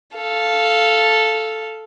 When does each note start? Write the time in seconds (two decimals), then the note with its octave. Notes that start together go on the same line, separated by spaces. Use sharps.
0.15 A4 F5